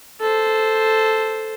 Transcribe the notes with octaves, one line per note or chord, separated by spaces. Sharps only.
A4 C5